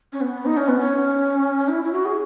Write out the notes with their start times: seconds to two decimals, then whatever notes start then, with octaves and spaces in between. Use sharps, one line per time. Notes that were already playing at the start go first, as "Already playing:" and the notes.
0.13 C#4
0.21 B3
0.46 D#4
0.57 C#4
0.68 B3
0.79 C#4
1.68 E4
1.84 E4
1.93 F#4
2.05 G#4